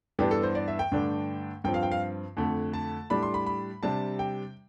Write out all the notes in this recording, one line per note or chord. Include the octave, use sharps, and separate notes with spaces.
G2 E3 B3 D4 G4
A4
C5
D5
E5
G5
G2 D3 A3 D4
G2 F3 C4 G5
F5
G5
F5
F2 D3 A3
A5
A2 G3 D4 B5
C6
B5
B5
C3 G3 D4 A5
G5